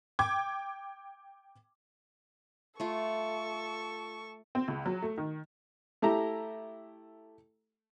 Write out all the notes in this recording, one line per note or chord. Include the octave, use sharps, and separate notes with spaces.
G5 D6 G#6
A3 F4 A4 C#6
C4
C#2
F#3
A3
D#3
A3 E4 G4 A#5